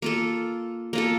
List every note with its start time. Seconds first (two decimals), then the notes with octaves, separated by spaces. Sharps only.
0.02 A#3 F4 A4
0.93 A#3 F4 A4